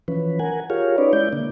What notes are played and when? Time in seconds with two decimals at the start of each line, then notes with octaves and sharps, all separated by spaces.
0.08 E3 F3 C#4 B4
0.39 A#4 F#5 G#5
0.70 F4 G4 G#4 A#4 C#5 F5
0.98 C#4 D#4 B4 C#5 D5
1.13 G#3 E4 D5 G6
1.33 D3 A#3 D4